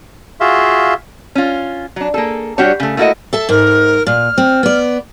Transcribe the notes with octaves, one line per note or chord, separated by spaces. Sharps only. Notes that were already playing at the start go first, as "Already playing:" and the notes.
F4 F#4 G#4 E5 F5 C6
C#4 F4
F#3 D4
A#3 G#4 A4
G3 D4 F#4 G4 C#5
C#3 A3
A3 A#3 E4 F#4 A4 D#5
A4 E5 A5
G#2 A#4
A#2 F6
C4
B3 D5